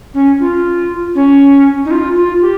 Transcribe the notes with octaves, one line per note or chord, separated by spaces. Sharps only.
C#4
F4
C#4
D#4
F4
F4
G4